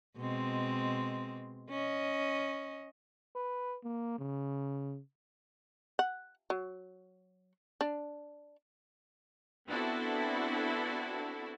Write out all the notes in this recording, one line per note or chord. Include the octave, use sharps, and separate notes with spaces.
B2 G#3 C4
C#4 D#5
B4
A#3
C#3
F#5
F#3
D4
B3 C4 D4 E4 F#4 A4